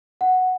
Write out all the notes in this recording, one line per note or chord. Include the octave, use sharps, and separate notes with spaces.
F#5